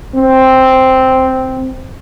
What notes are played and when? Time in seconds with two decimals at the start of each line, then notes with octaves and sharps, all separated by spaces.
0.16 C4